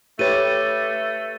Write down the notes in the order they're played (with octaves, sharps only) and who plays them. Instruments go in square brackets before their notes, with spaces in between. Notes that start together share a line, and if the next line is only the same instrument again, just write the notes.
[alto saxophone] A3 [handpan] G4 B4 C#5 [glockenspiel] A6 D#7